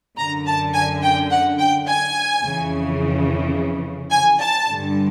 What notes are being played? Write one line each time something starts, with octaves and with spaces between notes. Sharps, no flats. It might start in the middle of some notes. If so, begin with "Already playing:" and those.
F#2 D3 A#5
A5
G#5
G5
F#5
G5
G#5
F2 C#3 E3
G#5
A5
G2 D3